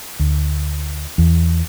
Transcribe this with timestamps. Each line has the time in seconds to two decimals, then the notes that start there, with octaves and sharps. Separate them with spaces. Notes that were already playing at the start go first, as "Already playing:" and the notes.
0.19 D2
1.18 E2